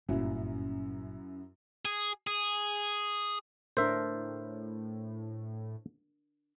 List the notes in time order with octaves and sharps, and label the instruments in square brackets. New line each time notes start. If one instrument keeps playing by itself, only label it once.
[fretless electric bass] G1 A#2 [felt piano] F#2 F#3 E4
[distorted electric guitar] G#4
G#4
[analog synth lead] A2 [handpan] D4 A#4 [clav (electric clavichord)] C5 E5